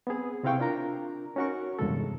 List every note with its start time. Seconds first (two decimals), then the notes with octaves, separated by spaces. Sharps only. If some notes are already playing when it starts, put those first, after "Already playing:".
0.07 B3 C4 G#4
0.43 C3 C4 E4 F5 G5 C#6
0.60 D4 F4 A#4 A#5
1.36 C#4 D#4 F#4 A#4 C#6
1.79 E2 G2 C3 G#3 A4